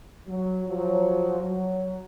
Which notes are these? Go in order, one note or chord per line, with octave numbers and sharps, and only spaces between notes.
F#3
F3 F#3
F#3